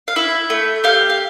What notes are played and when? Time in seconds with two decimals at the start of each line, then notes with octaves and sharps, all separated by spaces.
0.08 F5
0.16 E4 E5
0.50 A3
0.84 G4 F5
1.10 F5